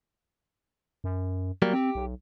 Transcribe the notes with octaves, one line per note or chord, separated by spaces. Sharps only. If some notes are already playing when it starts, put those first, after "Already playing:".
F#2
F#3 G3 A#3
C4 G4
B1